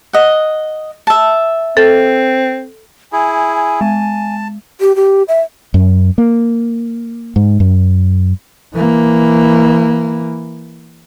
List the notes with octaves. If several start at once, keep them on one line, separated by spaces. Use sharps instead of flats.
D#5 F#5
E5 A5
C4 A4
E4 G#4 G#5
G#3 A5
G4
G4
E5
F#2
A#3
G#2
F#2
E3 A#3